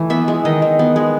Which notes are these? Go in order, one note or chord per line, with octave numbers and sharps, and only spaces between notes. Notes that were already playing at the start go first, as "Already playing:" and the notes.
Already playing: E3 A3
B3 E5
G#3
D#3 D#5
D#3
B3
G#3